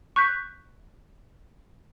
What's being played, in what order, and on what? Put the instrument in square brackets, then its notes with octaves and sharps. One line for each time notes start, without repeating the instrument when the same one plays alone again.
[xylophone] C#6 F#6 G6 B6